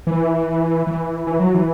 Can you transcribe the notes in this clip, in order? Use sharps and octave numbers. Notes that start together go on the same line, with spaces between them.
E3
E3
E3
F#3
E3